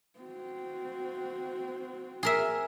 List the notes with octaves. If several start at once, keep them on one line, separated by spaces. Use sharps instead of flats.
C4 F#4
G#4 A#4 E5